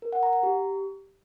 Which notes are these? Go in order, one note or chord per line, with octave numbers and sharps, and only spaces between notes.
A#4
F#5
A#5
A#5
G4